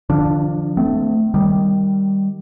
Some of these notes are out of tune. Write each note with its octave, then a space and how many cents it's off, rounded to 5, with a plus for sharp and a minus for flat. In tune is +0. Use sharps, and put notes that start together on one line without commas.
D3 +45 F3 -5 D4 +0
A3 +0 C4 -40
D#3 +0 G3 +0